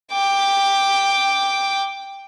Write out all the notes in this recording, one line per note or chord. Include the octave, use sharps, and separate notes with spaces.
G5 D6